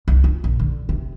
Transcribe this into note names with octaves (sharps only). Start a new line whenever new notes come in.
C2
F4
A#1
D3
C3